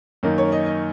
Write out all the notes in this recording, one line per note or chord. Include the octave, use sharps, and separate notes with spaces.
F#2 D#3 A#3 D#4
C#5
D#5
D#5